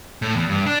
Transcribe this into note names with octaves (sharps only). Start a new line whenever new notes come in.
A2
E2
G2
D4